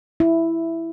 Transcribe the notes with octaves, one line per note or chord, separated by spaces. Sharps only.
E4